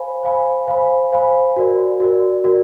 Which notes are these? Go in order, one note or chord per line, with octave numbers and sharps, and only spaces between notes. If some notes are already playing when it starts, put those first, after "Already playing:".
Already playing: C5 F5 G#5 B5
C5 F5 G#5 B5
C5 F5 G#5 B5
C5 F5 G#5 B5
F#4 A#4 D5
F#4 A#4 D5
F#4 A#4 D5